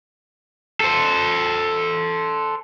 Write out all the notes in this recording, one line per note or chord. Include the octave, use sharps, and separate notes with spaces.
A4 C5